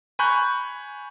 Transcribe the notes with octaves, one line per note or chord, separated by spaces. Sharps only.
G#5 A#5 B5 C#6 F#6 G6